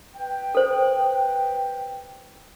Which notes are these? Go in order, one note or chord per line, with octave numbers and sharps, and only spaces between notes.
B4 G5
A4 C5